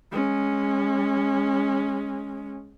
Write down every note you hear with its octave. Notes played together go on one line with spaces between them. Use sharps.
G#3 C#4